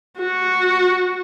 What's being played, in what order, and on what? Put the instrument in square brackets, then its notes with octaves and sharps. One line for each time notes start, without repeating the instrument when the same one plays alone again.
[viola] F#4